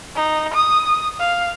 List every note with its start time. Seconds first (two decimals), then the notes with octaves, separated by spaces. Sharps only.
0.16 D#4
0.54 D#6
1.20 F5